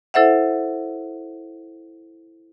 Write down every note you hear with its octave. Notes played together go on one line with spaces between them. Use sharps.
E4 A4 C5 E5 F#5